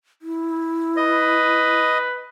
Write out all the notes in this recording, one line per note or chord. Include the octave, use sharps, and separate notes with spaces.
E4
B4 D#5